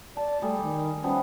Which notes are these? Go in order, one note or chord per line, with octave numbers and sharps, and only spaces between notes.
D5 A5
G3 A3 G#4
D#3
F3 G3 B3 C#4